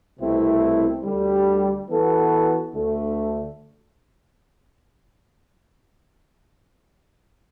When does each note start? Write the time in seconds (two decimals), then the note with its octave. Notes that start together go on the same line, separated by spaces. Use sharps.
0.19 C2 B2 A3 C4 E4
1.03 D2 D3 G3
1.89 E3 B3 F#4 A4
2.73 D2 D3 A3